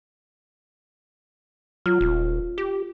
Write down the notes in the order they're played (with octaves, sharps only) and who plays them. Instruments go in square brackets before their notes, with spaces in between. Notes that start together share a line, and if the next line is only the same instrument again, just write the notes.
[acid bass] F#3 [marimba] F4
[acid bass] D#1
G4